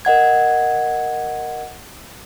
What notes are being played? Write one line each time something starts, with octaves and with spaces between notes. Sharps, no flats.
A#4 D#5 F#5 G#6